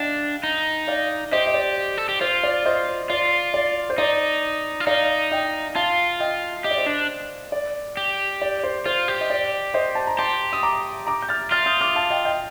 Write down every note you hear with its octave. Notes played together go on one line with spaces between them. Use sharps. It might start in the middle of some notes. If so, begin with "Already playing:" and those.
Already playing: D4 D#5 F5 G5
D#4
D5 F5
G4 C5 D#5
D#5
D5
A4
G4
F4 C5
D5
C5 D#5
F4 D5
D5
C5
D#4 D5
F4
D#4 D5 F5
D#5 G5
F4 F5 A5
D#5 G5
G4 D#5
D5
C5 D#5
D4
D5
G4
D5
C5
F4 C5
G4
D#5
D5
C5 D#5
A5
A#5
G4 A5 C6
D#6
A#5 D6
A#5 D6
G6
F6 A6
F4 F6 A6
D#6 G6
D6 F6
F5 A5
D#5 G5
D#5 G5